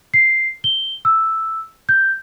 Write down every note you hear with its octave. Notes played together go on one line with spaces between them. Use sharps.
C7
G7
E6
G6